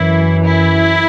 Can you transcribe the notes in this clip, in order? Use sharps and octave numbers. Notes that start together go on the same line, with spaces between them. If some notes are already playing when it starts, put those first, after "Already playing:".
Already playing: F#2 E3 E4
E4